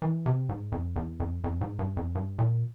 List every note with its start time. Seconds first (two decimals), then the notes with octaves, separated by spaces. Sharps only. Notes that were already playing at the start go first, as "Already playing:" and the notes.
0.02 E3
0.26 C3
0.49 G#2
0.72 F2
0.96 E2
1.20 F2
1.44 F2
1.61 G#2
1.79 G2
1.97 F2
2.15 G2
2.39 A#2